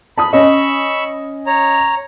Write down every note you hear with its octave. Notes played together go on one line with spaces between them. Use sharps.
A5 B5 D#6
C#4 D#5 B5 C#6 E6
C#5 A#5